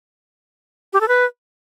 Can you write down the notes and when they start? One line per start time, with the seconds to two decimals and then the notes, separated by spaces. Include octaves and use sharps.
0.93 G4
1.01 A4
1.08 B4